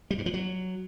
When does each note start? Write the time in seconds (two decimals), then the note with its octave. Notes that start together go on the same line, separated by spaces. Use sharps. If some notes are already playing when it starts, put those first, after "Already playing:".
0.11 G3
0.18 G2
0.26 F3
0.34 F#3